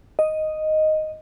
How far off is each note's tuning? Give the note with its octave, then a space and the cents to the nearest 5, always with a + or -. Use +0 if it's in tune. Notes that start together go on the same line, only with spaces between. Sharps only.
D#5 +0